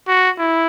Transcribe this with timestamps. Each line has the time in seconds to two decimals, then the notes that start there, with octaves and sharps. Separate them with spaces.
0.08 F#4
0.39 E4